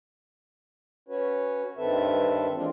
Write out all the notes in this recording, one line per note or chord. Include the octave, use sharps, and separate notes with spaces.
C#4 F#4 B4 C#5
G2 D#3 C4 A4 B4 E5
E3 G#3 A#3 C4 D4 F4